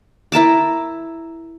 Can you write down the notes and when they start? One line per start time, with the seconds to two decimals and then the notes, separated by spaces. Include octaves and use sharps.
0.32 E4 A#4 A5 D6